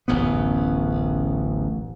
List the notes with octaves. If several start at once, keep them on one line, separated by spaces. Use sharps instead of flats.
D1 A1 F#2 B3